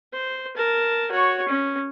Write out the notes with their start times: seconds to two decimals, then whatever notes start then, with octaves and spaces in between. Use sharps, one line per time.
0.13 C5
0.56 A#4 A5
1.11 F#4 C#5
1.48 C#4